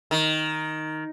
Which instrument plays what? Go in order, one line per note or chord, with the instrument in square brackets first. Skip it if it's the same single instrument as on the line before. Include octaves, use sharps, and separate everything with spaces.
[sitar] D#3